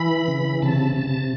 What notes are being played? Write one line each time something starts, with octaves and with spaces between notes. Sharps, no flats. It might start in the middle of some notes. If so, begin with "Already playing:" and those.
Already playing: E3 B5
C#3
C3 A5
C3